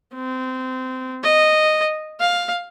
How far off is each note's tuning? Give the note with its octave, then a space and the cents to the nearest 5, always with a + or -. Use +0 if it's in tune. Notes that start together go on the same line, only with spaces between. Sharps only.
C4 -25
D#5 -10
F5 +10